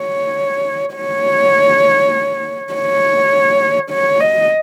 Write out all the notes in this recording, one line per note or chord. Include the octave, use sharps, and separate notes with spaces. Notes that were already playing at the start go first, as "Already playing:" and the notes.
Already playing: C#5
C#5
C#5
C#5
D#5